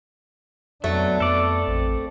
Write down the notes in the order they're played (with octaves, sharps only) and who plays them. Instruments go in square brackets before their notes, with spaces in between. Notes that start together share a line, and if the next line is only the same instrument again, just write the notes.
[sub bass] F2 [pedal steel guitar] F#3 [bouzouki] A3 [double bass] B3 D4
[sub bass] F2 [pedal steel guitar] A4 D5
[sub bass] A1 [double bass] C4